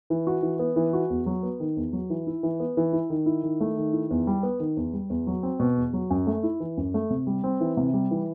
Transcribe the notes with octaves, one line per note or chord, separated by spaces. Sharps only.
E3
F#4
E3
B3
E3
F#4
E2
F#3
B3
D#3
E2
F#3
E3
E4
E3
B3
E3
E4
D#3
E4
D#3
A3
D#3
E4
E2
G3
B3
D#3
E2
G3
E2
F#3
C4
B2
E2
F#3
F#2
A3
E4
E3
F#2
A3
C3
G3
C4
E3
C3
G3
E3